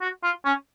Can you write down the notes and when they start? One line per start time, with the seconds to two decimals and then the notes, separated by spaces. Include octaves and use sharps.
0.01 F#4
0.23 F4
0.45 C#4